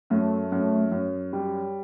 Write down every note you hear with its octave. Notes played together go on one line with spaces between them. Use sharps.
F#2 A3
F#2
F#2
G3